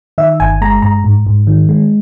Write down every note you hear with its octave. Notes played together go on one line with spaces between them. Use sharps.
D#3 E5
G1 G#5
G#3 A#5
G2 A#5
G#2
G#2
D#3
G#3